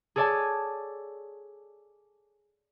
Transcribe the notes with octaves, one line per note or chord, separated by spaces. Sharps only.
G#4 A4 C#5 D5 G#5 A5